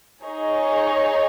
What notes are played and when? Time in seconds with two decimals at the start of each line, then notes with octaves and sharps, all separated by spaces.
0.23 D#4 G#4 C#5